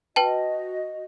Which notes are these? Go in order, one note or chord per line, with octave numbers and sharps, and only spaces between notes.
F#4 B4 D#5 G5 A5